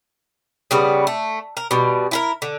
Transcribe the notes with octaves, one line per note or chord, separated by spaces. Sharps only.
C#3 G3 B3
A3
A#4
B2 G3
E4 A4 A#4
D3